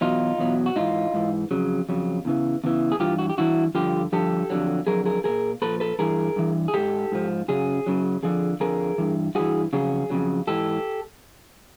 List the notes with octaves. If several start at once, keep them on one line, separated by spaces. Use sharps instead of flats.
E2 B2 F#3 D#4 F4
E2 B2 F#3
F#4
G#2 E3 D#4 F4
G#2 E3
F2 C#3 F#3
F2 C#3 F#3
E2 C#3 E3
E2 C#3 E3
G#4
G2 E3 F4 G4
F#4
G4
G2 E3 E4 F#4
G2 D3 F3 F4 G4
G2 D3 F3 G4 A4
F2 D3 F#3
F2 D3 F#3 G#4 A#4
G#4 A#4
A#2 F3 G#4 A#4
A#2 F3 A4 B4
A4 B4
G2 E3 G#4 A#4
G2 E3
G#4
G#2 F3 G4 A4
G#2 F3
F#2 C#3 F#3 G#4
F#2 C#3 F#3
F2 D3 F3 G#4
F2 D3 F3 G#4 A#4
G2 E3
G2 E3 F#4 G#4
F2 C#3 F#3 G#4
F2 C#3 F#3
G#2 E3 G4 A4